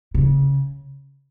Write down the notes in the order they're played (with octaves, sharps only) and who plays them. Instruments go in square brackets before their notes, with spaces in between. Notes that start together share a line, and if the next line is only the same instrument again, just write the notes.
[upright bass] C#3